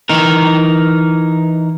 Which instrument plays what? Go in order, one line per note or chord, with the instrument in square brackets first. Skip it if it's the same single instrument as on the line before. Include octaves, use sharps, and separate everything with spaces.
[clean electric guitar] E3 D#4 A#4